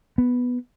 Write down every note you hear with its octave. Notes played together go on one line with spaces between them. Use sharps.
B3